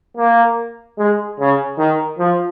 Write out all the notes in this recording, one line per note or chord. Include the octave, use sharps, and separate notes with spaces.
A#3
G#3
C#3
D#3
F3